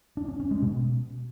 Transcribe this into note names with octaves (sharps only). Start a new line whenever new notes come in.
D4
C#4
C#4
G#3
B2